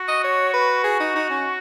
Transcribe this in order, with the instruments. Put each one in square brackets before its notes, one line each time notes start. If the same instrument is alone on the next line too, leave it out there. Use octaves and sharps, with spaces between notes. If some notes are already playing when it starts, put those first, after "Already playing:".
Already playing: [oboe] F#4
[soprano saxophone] D#5
C#5
B4
G#4
D#4
D#4
C#4